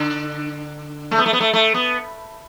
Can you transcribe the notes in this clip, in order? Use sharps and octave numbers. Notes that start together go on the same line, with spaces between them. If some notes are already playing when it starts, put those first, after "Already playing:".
Already playing: D3
A3
B3
A3
B3
A3
A3
B3